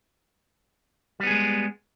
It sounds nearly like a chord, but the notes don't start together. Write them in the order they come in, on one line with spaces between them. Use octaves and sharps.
G3 B3 G#4 G#3